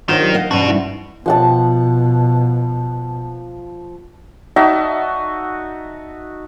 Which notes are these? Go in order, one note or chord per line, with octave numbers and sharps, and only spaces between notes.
D#3 D4 D#4 F4 C5 C#5 F#5
F#3 G4
D#5 F5 F#5
E2 G2 F3 B3 C#4 F#4
G3 D#4 E4
B2 F3 F#5 A5
D#4 F#4 E5 A5